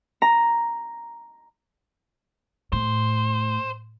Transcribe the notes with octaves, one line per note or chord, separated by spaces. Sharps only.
A#5
A2 C5